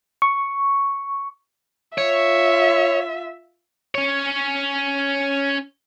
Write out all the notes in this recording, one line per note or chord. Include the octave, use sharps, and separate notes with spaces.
C#6
F4 C#5 E5
C#4 C#5